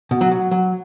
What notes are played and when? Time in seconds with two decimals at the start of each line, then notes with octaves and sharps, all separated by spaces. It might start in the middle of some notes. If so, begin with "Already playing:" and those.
0.11 B2
0.21 F#3 F#4
0.31 F#3
0.51 F#3